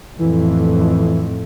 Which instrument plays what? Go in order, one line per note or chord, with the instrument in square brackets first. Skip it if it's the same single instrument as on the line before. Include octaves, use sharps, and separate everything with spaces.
[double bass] F2 A2 [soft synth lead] E3